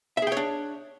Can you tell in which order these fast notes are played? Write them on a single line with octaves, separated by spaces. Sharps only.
E5 G#4 G5 C#5 D4